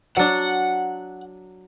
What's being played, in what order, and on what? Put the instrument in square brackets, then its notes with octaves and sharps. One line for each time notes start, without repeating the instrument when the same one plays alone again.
[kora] F#3 D4 [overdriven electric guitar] F#5